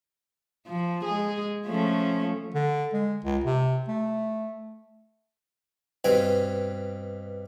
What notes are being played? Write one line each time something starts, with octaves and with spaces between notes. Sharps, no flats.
F3
G#3 G#4
F3 A3 C#4
D3
G#3
C#2
C3
A3
G2 B2 C4 G#5